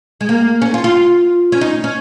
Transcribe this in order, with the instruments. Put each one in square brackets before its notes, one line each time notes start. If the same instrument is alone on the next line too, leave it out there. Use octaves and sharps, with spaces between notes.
[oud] G#3
A#3
C#4
F4
F4
C#4
D#4
C#4